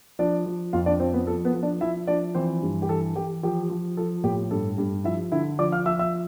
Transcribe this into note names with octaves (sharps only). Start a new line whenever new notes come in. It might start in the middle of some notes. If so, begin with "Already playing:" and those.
F3 D4 D5
F3
F2 F4 F5
D4 D5
F3 C4 C5
B3 B4
F3 A4
B3 B4
F3
D4 D5
F3 E4 E5
F3 D4 D5
E3 C4 C5
G2
G4
E3 A4
E3 G4
F3 G4
F3
F3 A4
A2 G4
G2 A4
G2
F3 E4 E5
D3 E4 E5
F3 D5 D6
F5 F6
F3 E5 E6
E5 E6